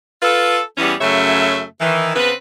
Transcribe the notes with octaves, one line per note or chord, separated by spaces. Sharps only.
F4 A4 B4
E2 E3 G3 B3 C#4
F#2 C#3 F#3 A3 C#5 E5
D#3 E3
C#3 B3 C4 B4